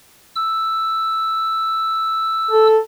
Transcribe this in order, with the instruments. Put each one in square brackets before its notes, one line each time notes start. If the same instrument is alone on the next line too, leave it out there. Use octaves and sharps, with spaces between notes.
[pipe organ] E6
[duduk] A4